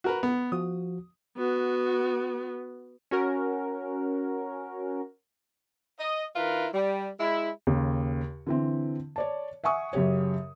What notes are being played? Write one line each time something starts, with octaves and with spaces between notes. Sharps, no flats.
F#4 A#4 B4
B3
F3 F#4 D#6
B3 F#4
C#4 F#4 A#4
D#5
D#3 E4 F4 A#4 B4
G3
G#3 E4
D#2 C#3
D3 E3 C4
C#5 D5 A5
E5 F#5 G#5 C#6 D#6
F#2 C#3 G4 C#5